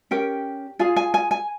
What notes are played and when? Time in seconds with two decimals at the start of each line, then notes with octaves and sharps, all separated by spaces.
0.11 C#4 G4 A#4 G5
0.79 F4 G#4 G#5
0.96 G#5
1.14 G#5
1.31 G#5